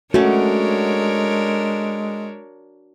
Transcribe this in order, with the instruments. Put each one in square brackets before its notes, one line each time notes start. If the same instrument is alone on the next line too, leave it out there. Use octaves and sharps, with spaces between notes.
[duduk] G#3 [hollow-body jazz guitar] A3 C#4 [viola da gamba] D4 A#4 C#5 [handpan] F#4